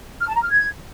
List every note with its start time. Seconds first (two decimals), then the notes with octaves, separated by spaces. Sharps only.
0.20 F6
0.28 A5
0.35 A#5
0.42 F6
0.50 G#6